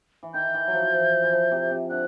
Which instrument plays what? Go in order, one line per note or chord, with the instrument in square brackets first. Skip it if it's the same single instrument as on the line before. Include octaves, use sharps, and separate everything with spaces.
[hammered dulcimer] E3
[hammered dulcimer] D#3 [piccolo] G6
[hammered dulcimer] E3
F#3
F3
E3
F3
E3
F3
C3
C3
[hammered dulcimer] D3 [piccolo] F#6